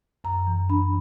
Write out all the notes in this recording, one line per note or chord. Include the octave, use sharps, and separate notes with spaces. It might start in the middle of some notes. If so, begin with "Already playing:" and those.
F#2 A#5
E3
D4 B5